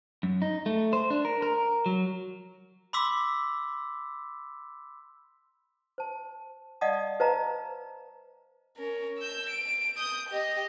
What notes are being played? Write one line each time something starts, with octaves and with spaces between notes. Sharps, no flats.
F#2
D#4
A3
C5
D4
A#4
A#4
F#3
B5 C6 D6 E6 B6
C5 A5
D5 D#5 F5 F#5 A5 D#6
B4 C5 D#5 F5 A5 A#5
C#4 A#4
E6 G6
D7
D#6 G6
G4 D#5